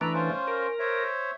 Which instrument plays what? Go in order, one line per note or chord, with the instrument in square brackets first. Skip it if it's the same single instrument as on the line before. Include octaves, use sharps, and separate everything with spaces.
[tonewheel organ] E3 A3 D4 [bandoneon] B4 E5 A#5
[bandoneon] C#4 F4 C5
[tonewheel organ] A#4
[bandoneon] C5 C#5 E5